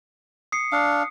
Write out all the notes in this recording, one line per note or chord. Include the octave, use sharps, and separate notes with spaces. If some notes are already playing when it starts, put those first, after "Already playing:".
D#6 C7 C#7
D4 F5 D#6